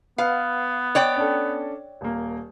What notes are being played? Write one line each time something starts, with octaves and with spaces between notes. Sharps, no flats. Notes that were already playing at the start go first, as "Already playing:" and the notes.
B3 B4 F5 F#5
C#5 D5 G5
C#4 D4 A4
D#1 A#3